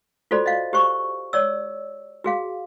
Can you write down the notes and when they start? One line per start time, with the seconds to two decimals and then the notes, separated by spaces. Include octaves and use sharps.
0.31 F4 F#4 A4 C5 D5
0.46 D#5 F5
0.73 G4 C5 C#6
1.33 C#5 D5 E6
2.24 F#4 G#4 F5